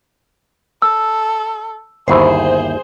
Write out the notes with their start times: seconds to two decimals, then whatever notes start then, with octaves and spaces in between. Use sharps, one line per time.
0.82 A4 E6
2.08 G1 D#2 E4 G#4 C5